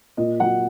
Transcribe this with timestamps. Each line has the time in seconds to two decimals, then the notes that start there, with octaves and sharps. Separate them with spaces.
0.17 A#2 D#5
0.40 F#3 F#5